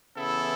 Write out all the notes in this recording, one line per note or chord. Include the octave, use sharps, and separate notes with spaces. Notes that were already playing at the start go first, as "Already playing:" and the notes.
C#3 E3 B3 E4 A4